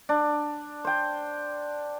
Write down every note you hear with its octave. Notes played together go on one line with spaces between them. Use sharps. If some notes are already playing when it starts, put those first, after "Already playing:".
D4
C5 G5